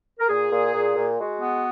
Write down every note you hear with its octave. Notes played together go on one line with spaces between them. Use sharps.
A#4
A#2 G#4
A#2
A#2
A#2
G#3 F#4
B3